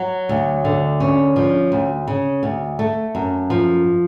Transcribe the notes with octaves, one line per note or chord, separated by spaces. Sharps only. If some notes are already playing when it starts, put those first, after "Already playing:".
Already playing: F#3
D2
D3
C#4
F3
D2
C#3
D2
A3
F#2
F3